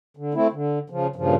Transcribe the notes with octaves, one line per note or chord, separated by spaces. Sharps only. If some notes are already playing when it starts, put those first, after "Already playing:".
D3
A3 C4 E4
D3
C#3 F3
G2 A#2 C#3 F3